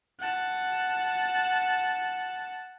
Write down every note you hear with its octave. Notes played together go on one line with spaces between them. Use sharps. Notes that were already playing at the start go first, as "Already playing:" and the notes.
F#5 A5